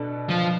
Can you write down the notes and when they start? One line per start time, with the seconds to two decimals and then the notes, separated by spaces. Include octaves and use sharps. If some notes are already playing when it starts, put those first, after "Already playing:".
Already playing: B2 B3 D4 A4
0.30 F3